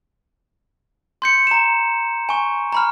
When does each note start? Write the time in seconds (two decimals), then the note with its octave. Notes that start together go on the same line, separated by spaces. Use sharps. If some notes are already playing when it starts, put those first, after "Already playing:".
1.22 C6 G6 C#7
1.47 A#5 E7
2.29 G#5 C#6
2.72 A#5 B5 F6